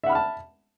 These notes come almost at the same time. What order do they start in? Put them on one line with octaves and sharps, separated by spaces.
E5 F#5 B5 F6 A5